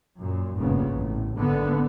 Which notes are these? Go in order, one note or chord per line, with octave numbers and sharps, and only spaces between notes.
F#2 A#2
F1 G2 A#2 C#3 B3
A1
G#1 D3 B3